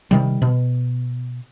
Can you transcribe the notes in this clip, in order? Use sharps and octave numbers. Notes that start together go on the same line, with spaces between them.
C3 D#3 G3
B2